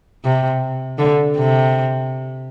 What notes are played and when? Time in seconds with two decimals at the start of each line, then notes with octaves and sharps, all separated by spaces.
0.25 C3
0.99 D3
1.37 C3